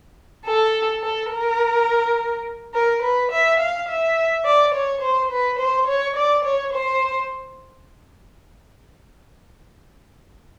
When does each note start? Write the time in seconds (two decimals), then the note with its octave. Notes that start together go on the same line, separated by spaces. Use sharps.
0.46 A4
1.02 A4
1.30 A#4
2.74 A#4
3.02 B4
3.31 E5
3.59 F5
3.87 E5
4.45 D5
4.74 C#5
5.01 C5
5.30 B4
5.58 C5
5.87 C#5
6.16 D5
6.44 C#5
6.73 C5